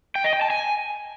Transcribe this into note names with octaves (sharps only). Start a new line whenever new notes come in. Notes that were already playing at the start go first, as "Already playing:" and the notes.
G5
D#5
G5
A5
G#5